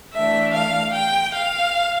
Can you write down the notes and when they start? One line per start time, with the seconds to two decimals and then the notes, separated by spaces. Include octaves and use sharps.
0.15 E3 A3 D4 E5
0.54 F5
0.94 G5
1.34 F5